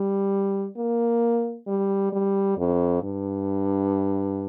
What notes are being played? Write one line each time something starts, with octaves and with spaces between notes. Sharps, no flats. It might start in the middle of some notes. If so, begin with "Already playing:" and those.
Already playing: G3
A#3
G3
G3
F2
G2